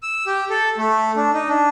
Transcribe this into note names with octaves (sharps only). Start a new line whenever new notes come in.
E6
G4
A4
A3
D4
D#4
D4